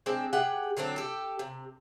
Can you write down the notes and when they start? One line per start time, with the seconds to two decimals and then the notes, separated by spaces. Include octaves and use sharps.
0.06 G#3 C4 D4 G4
0.33 G4 G#4 F#5 G5
0.77 D3 F#3 C4 D4
0.96 G4 A4
1.39 C3